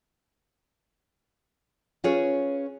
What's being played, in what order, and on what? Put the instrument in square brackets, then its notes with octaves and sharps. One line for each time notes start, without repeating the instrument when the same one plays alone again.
[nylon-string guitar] C#4 F4 G#4 B4 C#5